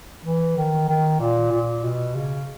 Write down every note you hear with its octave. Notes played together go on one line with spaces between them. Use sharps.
E3
D#3
D#3
A#2
A#2
B2
C#3